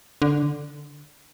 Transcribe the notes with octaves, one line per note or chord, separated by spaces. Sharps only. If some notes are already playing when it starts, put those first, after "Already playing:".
D3